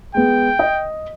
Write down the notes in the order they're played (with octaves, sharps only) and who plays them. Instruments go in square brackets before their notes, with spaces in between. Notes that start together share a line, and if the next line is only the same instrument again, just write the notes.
[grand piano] G#3 B3 [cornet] G5
[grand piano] D#5